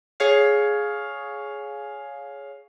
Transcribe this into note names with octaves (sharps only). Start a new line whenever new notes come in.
G#4 C#5 F5